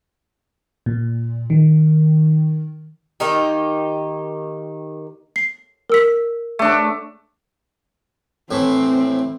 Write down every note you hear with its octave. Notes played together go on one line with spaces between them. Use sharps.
A#2
D#3
D#3 A#3 D#4 G4
C7
A#4 E6 B6
A3 D4
A2 E3 C4